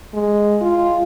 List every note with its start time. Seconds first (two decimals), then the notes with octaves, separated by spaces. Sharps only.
0.14 G#3
0.61 F4